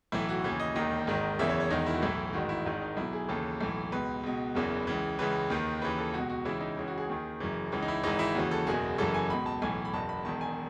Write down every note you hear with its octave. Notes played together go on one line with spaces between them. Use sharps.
B1 A2 E3 E4
F#4
D#2 C#3 E3 G#4
D#5
E1 D#2 D#3 D#5
G#1 G#2 D#3
F#1 E2 C#3 E3 E5
C#5
C#5
E1 E2 D#3 D#4
E4
F#4
B1 A2 E3 E4
A1 G#2 D#3 F#4
E4
G#1 G#2 D#3
D#4
B1 B2 E4
G#4
D#2 C#3 E3 A4
B1 A2 E3
C#2 B2 B4
C#2 B2
F#1 E2 C#3 E3
C#2 C#3 E3
C#2 C#3 E3 B4
D#2 D#3
D#2 C#3 E3 B4
A4
C#2 B2 F#4
F#4
C#2 C#3 E3 E4
D#4
C#2 C#3 E3
F#4
G#4
D#2 D#3
F#1 F#2 C#3 E3
C#2 C#3 E3
D#4
E4
G#1 G#2 E3 D#4
E4
D#2 C#3 E3 F#4
A4
F#1 E2 B2 G#4
F#1 F#2 C#3 E3 A4
G#5
C#2 B2 B5
A5
B1 A2 E3 G#5
B5
F#1 E2 B2 A5
B5
E1 E2 D#3 A5
G#5